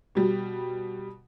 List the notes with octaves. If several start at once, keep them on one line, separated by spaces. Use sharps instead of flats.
B2 G3